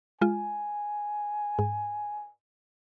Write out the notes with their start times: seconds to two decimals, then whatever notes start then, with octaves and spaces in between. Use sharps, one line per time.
0.21 G#3 F4 G#5
1.59 G#2